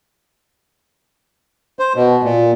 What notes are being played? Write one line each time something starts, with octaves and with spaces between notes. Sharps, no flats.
C5
B2
A#2